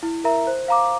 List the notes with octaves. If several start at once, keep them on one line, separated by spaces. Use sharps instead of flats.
E4
A#4 E5 A#5
C5
F5 A#5 D6